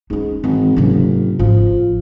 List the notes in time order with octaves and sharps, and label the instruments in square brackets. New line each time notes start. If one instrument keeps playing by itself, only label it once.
[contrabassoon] G#2 [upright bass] C#4 D#4
[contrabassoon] G#1 [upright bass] G#2 E3
[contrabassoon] F#1 [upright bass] G#2 C3
[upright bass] G#1 [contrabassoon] F3